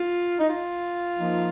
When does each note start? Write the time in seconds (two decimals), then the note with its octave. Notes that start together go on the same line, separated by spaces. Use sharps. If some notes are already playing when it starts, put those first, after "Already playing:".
Already playing: F4
0.38 D#4
0.46 F4
1.17 F3 A#3 D#4